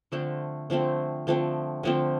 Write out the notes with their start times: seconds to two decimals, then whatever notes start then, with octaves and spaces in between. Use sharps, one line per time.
0.12 D3 F3 A3 C4
0.70 D3 F3 A3 C4
1.27 D3 F3 A3 C4
1.83 D3 F3 A3 C4